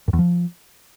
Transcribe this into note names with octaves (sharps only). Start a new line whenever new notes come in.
F#2
E2
F3